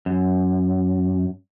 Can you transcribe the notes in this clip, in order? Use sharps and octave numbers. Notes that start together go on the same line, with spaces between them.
F#2